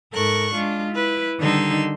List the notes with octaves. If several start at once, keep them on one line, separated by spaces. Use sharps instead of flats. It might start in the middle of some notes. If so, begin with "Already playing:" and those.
G#2 A4 A#4 C#6 F#6
G#3 D4 F4
E4 B4
D3 D#3 G3 D#4 C6 E6